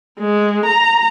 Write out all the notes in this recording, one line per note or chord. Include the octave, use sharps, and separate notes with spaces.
G#3
A#5